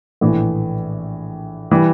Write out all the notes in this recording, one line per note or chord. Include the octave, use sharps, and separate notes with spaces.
A#1 A2 E3
E3 G3